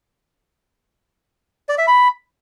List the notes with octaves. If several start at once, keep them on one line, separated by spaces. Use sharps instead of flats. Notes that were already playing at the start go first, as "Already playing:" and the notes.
D5
E5
B5